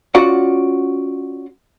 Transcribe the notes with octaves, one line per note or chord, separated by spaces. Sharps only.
C#4 F4 F#4 D5 F#5